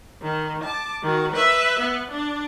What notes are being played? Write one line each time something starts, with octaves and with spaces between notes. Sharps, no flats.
D#3
A5 D6
D#3 F#4
B4 E5
B3
D4